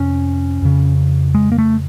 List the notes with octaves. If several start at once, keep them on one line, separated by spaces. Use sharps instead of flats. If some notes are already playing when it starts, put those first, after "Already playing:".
Already playing: F2 C3 C#4
F2 C#3
G#3
A#3
A3